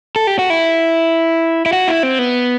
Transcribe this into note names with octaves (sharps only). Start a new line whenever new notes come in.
A4
G4
F#4
E4
E4
F#4
E4
C4
B3